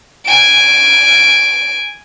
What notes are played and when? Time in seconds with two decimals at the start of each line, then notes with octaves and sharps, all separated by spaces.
0.25 G#5 D7